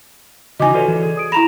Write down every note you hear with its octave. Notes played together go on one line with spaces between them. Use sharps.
C#3 E3 D#4 F#4 D#5 G#5 D6
F4 F#4 A4 B4 C#5 D5
E3
G#4
D#6 D7
E4 A#5 B5 A#6 E7 F7